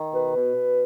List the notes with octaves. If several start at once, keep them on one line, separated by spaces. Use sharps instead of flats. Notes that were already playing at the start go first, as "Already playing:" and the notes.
Already playing: D#3
B2 B4
B2
B2